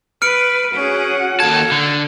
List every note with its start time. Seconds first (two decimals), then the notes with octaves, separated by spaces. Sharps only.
0.22 B4 F6 C#7 D7
0.73 C#4 F#4 G#4 F#5
1.40 D#2 A4 A5 G#6
1.72 D3